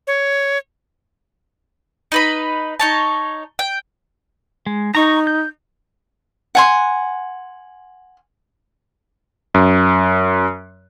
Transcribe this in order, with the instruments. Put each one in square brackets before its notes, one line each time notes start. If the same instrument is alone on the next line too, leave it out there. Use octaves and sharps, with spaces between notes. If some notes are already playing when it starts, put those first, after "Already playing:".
[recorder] C#5
[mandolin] D#4 B4 B5
D#4 C#5 A5
G5
[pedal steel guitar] G#3
[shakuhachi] D#4 [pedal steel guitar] A#5 C#6
[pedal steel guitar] G6
[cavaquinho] F#5 G#5 C6
[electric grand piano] F#2